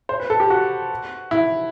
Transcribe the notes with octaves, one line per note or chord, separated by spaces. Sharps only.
C5
B4
A4
G4
F#4
E4